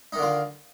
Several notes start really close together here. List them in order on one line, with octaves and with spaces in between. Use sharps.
D#4 D#3 D3 F4